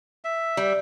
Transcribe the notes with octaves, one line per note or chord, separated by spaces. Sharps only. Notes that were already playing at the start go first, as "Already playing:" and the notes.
E5
G3